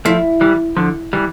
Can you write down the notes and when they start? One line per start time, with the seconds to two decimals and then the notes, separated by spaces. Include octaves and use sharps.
0.05 F3 A3 E4
0.41 E3 G3
0.77 D3 F3
1.13 E3 G3